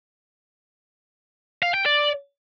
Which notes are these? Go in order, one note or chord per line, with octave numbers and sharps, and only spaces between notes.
F5
G5
D5